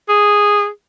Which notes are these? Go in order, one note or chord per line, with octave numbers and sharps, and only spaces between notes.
G#4